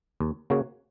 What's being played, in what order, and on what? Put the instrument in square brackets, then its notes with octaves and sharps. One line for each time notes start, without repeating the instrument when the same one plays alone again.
[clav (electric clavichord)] D#2
C#3 A#3 F#4 C#5